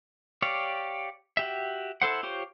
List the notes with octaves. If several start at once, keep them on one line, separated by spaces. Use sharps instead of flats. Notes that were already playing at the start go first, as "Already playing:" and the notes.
G4 C#5 D5 F5
F#4 G4 E5
E4 A4 C5 F#5
F4 G4 C5 C#5